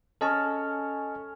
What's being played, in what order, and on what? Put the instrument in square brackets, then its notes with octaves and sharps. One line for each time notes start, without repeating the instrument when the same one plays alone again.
[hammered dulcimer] C#4 C#5 [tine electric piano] A4 D#5 A5